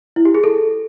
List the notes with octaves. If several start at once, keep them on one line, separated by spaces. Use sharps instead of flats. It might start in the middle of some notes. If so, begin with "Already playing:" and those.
E4
G4
G#4
A4